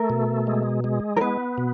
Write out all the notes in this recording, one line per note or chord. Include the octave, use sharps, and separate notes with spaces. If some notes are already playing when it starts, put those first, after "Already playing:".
Already playing: A3 A#4
B2
G#3
G#3
A#4
B3 B4
B2